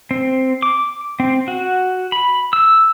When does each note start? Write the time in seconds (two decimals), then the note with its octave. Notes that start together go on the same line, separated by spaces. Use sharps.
0.11 C4
0.62 D6
1.20 C4
1.48 F#4
2.12 B5
2.53 E6